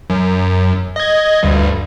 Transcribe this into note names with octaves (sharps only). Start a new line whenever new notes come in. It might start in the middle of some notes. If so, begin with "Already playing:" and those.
F#2
D#5 G#6
D2 G2